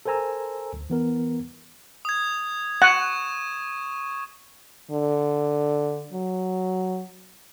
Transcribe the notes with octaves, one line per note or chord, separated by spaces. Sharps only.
A4 A#4 C5 G#5 A#5 E6
D2
E3 B3 A#4
D#6 G#6
F#5 C#6 E7
D3
F#3